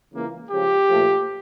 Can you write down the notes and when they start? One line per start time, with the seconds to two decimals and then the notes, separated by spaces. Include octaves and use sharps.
0.12 C#2 C#3 E3 A#3
0.51 C#2 C#3 F3 G4
0.90 A#2 F3 A3